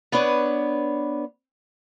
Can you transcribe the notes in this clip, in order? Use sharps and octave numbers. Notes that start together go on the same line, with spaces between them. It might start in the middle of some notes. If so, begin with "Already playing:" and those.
B3 D4 B4 C#5